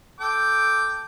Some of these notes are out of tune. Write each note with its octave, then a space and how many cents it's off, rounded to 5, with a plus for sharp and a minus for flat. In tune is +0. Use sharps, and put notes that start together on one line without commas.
A4 +0 G5 +0 D6 +0